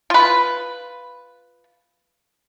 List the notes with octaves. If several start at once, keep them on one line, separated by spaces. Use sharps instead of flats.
F4 B4